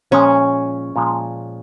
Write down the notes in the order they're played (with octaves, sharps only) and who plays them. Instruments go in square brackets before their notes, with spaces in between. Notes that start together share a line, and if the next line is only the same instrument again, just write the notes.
[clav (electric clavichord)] A#2 F3 G#3 [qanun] C#4
[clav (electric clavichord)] A#2 F3 G#3